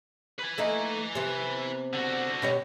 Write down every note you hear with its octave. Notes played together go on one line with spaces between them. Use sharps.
B4 G#5
A3 A#3 D#4
C3 B3
D3 F#4
B2 G4 C#5